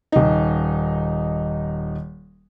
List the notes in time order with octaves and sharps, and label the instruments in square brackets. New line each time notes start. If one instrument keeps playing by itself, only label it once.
[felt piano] D#1 D#4